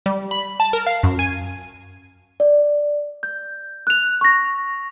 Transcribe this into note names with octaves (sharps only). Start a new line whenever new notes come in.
G3
B5
A5
A#4
F5
F#2
G#5
D5
G6
F#6 F7
C#6 A#6